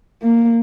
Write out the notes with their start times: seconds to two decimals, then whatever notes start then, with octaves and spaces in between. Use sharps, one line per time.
0.23 A#3